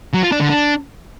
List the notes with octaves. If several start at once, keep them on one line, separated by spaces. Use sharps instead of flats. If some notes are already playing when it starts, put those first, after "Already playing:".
F#3
F4
D4
D3
D4